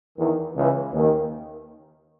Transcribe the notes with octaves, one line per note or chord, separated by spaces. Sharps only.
E2 D#3
C#2 C#3 E3
D#2 D#3